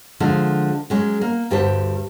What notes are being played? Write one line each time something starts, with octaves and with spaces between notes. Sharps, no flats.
D3 F3 G#3
F#3 G#3 C#4
A#3
D2 G2 G4 C5 A5